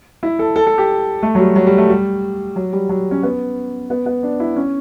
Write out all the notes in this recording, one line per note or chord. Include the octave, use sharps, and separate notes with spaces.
E4
A4
A4
A4
G4
A3
F#3
G3
F#3
G3
A3
G3
F#3
G3
F#3
C#4
B3
B3
B3
D4
E4
C#4